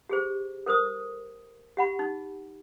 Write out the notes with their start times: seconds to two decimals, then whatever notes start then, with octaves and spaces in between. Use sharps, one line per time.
0.09 G4 G#4 C5
0.66 A4 A#4 C5 D#6
1.77 G4 F#5 B5
1.99 D#4